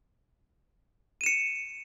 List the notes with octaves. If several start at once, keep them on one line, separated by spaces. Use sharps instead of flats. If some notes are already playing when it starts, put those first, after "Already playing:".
C#7 D#7 E7